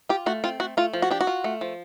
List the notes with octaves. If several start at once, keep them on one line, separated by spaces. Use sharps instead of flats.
F4 G4
A3 F#4
C4 F4
A3 F#4
A3 F4
F3
F#4
D4 G4
F#4
F4
A3
F3